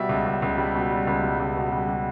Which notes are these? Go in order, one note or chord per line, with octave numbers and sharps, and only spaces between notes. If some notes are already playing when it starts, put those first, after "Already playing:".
Already playing: B2 G3 E5
C#2
C#2
C#2
G3
B2
G3
C#2
G3
C#2
B2
G3
G3